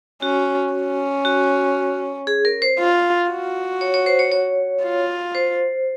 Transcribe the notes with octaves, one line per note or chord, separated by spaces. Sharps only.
C#4 F#4
C#4
F#4
G#4
A#4
C5
F4
F#4
C#5
C#5
C5
C#5
C#5
F4
C5